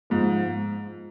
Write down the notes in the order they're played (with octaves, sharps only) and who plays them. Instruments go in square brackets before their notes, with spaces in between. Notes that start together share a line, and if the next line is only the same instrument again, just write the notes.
[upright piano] G#2 F3